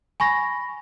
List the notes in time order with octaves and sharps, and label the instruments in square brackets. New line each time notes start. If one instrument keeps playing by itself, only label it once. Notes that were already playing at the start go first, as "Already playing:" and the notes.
[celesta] G#5 B5 C#6 A#6